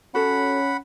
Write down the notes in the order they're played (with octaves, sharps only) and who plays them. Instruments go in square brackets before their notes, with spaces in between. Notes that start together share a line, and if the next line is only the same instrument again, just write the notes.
[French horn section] C#4 [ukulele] F#4 A4 [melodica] F#5 B5